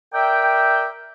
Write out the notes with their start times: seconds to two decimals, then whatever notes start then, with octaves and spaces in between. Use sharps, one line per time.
0.14 A#4 D5 E5 G5